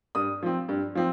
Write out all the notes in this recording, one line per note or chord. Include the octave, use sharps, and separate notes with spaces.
G2 D#6
F3 C4
G2
F3 C4